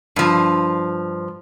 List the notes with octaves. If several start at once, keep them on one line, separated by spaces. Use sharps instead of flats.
G2 F3